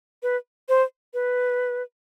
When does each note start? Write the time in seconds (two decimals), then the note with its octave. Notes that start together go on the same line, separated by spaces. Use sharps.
0.23 B4
0.69 C5
1.14 B4